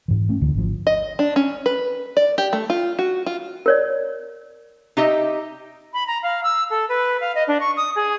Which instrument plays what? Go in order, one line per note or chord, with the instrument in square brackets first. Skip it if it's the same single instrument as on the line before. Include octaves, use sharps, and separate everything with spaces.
[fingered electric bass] G#2 E3
A3 C#4
D2 D3 E3
G#1 F3
[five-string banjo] D#5
D4
C#4
B4
D5
G4
A3
F4
F#4
F4
[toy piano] A#4 C#5 D5
[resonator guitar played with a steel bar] D#4 G4 D#5 E5
[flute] B5
A#5
F5
E6
A4
B4
F5
D#5
D4
C#6
D#6
G#4